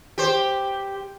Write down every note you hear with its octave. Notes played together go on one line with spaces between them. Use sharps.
G4 C5